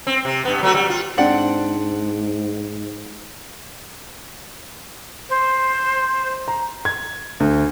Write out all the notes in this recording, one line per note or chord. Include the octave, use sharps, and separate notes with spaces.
C4
C3
G2 B3
F#3 A3 F#4
G3
F4
G#2 C4 D4 F#5
C5
A#5
G#6
D2